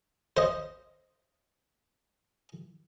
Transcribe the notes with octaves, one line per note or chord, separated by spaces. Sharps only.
C5 D#5